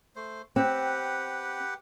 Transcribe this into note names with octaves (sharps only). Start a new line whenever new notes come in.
A3 C5
C4 G4 B4 F#5